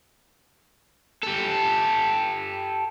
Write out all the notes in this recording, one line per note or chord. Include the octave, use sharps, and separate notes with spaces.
G4 A4